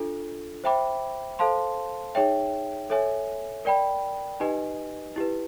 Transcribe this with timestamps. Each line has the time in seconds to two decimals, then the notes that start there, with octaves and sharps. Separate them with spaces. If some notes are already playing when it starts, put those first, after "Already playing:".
Already playing: D4 F4 A4
0.64 C5 E5 G5 B5 D6
1.39 A4 C5 F5 A5 C6
2.15 D#4 G#4 C#5 E5 G5
2.90 A4 C#5 E5 G#5
3.65 A#4 D5 G5 B5
4.40 D#4 G4 B4 D#5 G#5
5.16 E4 G4 B4